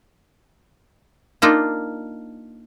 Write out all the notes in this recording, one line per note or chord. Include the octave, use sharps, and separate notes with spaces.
A#3 D4 D#4 F4